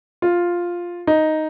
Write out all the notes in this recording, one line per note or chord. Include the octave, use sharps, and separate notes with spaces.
F4
D#4